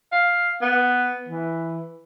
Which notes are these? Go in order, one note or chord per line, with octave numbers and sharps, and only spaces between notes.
F5
B3
E3